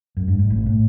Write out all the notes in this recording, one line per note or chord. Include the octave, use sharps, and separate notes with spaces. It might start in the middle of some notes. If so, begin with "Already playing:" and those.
F#2
G2
G#2
A1 A2
A2